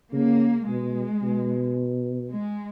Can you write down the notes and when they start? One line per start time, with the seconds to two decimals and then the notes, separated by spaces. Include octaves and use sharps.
0.12 C#3 A#3
0.67 B2 G#3
1.22 B2
2.30 G#3